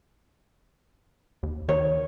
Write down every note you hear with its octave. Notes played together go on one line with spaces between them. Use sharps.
D#2
D#3 C#5